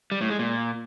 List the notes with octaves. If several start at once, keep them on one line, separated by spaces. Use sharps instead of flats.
G3
A2
G#3
A#2